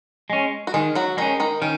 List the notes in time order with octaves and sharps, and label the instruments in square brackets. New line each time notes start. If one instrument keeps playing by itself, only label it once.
[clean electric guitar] G#3 C#4
[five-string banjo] F#4
[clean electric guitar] D#3 [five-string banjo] G#3 G#4
[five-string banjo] F#3 F#4
[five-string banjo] D#3 D#4 [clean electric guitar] G#3 C#4
[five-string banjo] D#3 D#4
[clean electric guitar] D#3 [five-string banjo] C#4